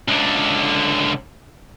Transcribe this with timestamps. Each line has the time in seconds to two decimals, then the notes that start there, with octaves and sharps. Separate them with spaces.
0.08 C#2 D3